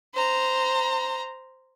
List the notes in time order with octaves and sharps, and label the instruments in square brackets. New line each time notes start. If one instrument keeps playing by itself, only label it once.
[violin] C5 A#5